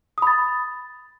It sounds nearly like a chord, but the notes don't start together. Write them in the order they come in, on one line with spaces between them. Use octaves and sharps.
D#6 B5 A6